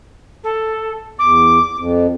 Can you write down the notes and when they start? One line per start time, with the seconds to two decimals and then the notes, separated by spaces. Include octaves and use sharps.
0.44 A4
1.19 E2 D6
1.77 F2